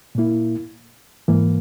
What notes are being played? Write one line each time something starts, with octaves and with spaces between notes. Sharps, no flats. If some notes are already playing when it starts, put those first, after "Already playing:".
A#2 A#3 E4
G#2 E3 A#3